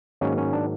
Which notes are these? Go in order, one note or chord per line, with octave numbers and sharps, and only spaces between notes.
G#2 D#3 F#3 A#3 C#4
C#4
D4